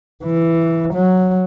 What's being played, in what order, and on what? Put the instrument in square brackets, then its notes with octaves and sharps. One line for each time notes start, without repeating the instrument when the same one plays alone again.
[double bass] E3
F#3